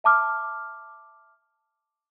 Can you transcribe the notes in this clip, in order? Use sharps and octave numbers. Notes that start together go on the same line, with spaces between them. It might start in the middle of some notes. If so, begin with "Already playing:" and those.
E5 A5 D6 F6